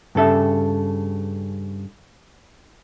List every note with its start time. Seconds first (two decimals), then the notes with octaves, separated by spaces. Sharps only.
0.15 G2 C#3 A4 E5